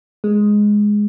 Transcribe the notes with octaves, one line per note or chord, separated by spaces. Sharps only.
G#3